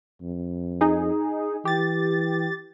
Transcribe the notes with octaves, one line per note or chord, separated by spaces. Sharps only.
F2
D#4 G#4
E3 G4 A6